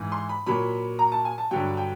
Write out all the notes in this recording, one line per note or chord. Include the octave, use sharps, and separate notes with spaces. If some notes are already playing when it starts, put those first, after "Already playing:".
Already playing: G#2 E3
C6
B5
A#2 F#3 B5
A#5
A5
G#5
A5
G2 D3 F#3 G5
G5